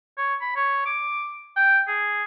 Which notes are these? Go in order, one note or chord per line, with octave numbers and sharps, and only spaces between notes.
C#5
B5
C#5
D6
G5
G#4